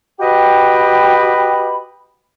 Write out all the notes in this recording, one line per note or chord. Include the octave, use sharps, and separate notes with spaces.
F#4 G4 B4 D#5 G5 B5